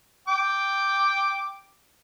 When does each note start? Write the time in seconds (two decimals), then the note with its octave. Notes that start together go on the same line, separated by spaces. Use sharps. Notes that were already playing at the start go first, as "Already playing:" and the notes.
0.28 G5 D6